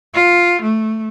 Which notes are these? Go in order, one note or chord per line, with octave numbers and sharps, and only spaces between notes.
F4
A3